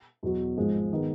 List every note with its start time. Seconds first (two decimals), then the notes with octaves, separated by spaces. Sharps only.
0.23 E2 B2 F#3
0.57 G#1 G#2 F3 G#3
0.93 D#3 G#3 B3